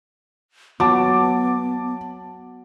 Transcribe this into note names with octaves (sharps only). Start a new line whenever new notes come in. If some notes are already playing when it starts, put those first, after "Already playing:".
F#3 B3 A5 D6